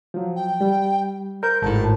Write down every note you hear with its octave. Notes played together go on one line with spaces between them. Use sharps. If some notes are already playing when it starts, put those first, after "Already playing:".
F3 F#3
G5
G3
A#4 C5 G6
G#1 A2 A5